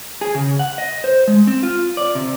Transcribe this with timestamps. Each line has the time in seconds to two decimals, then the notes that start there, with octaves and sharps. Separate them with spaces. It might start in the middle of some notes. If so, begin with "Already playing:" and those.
0.21 G#4
0.35 C#3
0.59 F#5
0.78 D#5
1.04 C5
1.28 G#3
1.47 C4
1.63 F4
1.97 D5
2.15 C3